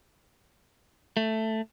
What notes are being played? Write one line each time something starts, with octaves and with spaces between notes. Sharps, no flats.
A3